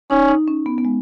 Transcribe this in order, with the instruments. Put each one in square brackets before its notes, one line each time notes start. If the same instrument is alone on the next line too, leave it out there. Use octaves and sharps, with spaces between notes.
[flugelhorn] C#4 [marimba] D#4
[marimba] D#4
C#4
B3
B3
G#3